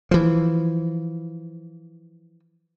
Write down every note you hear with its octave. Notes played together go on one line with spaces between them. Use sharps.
E3 F3